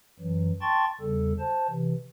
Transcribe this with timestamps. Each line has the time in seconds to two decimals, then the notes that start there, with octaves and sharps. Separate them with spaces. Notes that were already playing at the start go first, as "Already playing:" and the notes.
0.19 F#2 E3 F#3
0.62 G5 A5 C6 C#6 A6
1.01 E2 C#3 G3 A4
1.39 C5 A5
1.69 C3 E3